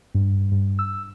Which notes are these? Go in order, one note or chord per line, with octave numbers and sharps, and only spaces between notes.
G2
G2
E6